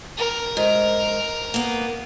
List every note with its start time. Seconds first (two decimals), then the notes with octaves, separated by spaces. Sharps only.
0.18 A#4
0.57 G#2
1.54 A#3 B3